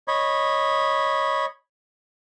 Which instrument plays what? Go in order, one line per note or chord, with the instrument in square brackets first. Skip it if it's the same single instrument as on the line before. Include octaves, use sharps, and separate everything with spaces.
[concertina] C#5 D#5 B5